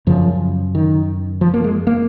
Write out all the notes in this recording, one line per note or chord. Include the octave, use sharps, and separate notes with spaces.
F#2 C#3 F3
D#3
F3
A#3
G#3
A#3